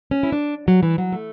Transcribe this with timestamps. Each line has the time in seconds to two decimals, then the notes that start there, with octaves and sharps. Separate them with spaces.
0.11 C#4
0.23 E4
0.32 D4
0.68 F#3
0.83 E3
0.98 F#3
1.12 A3